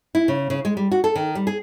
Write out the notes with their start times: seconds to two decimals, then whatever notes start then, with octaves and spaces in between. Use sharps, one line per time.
0.15 E4
0.28 C#3
0.50 C#3
0.65 G#3
0.77 G3
0.92 F#4
1.04 A4
1.16 D#3
1.35 G3
1.47 G#4